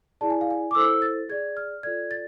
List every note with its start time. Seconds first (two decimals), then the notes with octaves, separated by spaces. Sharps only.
0.21 E4 G#4 D5 A5
0.30 G#5
0.41 F5
0.51 G#5
0.71 D6
0.75 E4 A4 C5 E6
1.02 A6
1.29 G#4 D5 G#6
1.57 F6
1.83 F4 A4 D5 G#6
2.11 A6